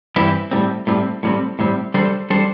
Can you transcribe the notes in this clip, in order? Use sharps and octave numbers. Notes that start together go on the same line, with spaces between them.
G2 E3 C4 E4 G4
A2 G3 C4
A2 G3 C4
A2 G3 C4
A2 G3 C4
G3 D4 A4 C5
G3 D4 A4 C5